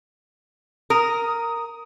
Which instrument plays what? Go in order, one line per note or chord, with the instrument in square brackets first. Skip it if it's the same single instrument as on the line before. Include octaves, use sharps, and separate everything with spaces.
[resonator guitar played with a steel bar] A#4 [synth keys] D#6